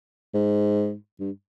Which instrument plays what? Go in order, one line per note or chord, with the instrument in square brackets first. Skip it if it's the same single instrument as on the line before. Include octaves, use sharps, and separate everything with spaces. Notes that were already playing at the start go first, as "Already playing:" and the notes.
[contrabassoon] G#2
G2